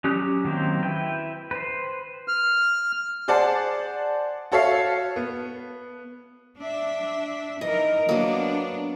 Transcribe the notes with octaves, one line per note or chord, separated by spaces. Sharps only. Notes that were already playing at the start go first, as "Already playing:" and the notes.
F#3 C#4 G4 D#6 F#6
D#3 F#3 A#3 C4 D#4
E4 B4 G5
B4 C5
F6
G#4 C5 D5 F#5 A5
F#4 A4 C#5 E5 F5
B3
D4 E5
E3 D#4 A#4 D#5
F#3 A#3 B3 D4